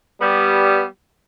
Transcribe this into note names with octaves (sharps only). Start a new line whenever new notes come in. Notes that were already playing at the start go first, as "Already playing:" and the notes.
G3 B3